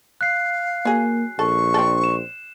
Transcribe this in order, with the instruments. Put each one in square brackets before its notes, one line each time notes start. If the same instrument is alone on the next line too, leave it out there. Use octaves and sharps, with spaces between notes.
[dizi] F5 [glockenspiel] F#6 C7
[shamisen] F#3 G#4 [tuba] A#3
[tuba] A#1 [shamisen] A4 [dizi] C#6
[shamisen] C4 D4 A4
[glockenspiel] E7